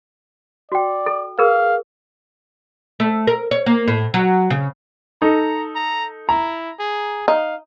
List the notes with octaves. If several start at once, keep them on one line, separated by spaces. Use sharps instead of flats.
F#4 D5 G5
A4
G#4 A#4 B4 F5
A3
A#4
C#5
A#3
A2
F#3
C#3
D#4 A4 A#5
A#5
E4 A#5
G#4
D#4 F5